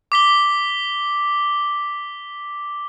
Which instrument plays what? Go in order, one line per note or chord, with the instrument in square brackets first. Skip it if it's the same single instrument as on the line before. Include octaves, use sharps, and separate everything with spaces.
[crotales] D6 B6 G7